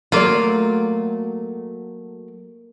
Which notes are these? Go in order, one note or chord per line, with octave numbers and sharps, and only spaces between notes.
F#3 A3 A#3 F4 D5